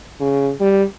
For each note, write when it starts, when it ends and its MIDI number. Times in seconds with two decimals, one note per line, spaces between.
0.20 0.51 49
0.60 0.83 55